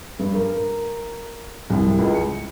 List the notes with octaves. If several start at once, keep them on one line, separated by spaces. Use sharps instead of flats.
G2
A#4
C2
C#2
C#7